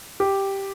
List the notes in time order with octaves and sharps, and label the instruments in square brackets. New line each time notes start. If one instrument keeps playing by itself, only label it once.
[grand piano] G4